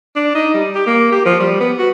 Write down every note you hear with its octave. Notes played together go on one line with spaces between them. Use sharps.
D4
D#4
G3
G4
A#3
G4
F3
G3
B3
F#4